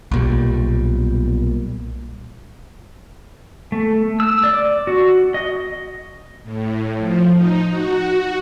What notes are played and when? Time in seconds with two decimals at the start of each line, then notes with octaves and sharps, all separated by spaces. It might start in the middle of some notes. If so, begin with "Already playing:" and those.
0.11 B1 A#2 G3
3.72 A3
4.20 E6
4.44 D5
4.87 F#4
5.34 D#5
6.43 A2
6.98 F3
7.33 D#4
7.69 F#4